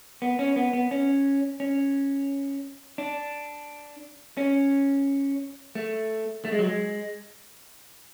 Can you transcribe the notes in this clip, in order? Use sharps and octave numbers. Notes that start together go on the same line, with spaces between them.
B3
C#4
B3
B3
C#4
C#4
D4
C#4
A3
A3
G#3
F#3
G#3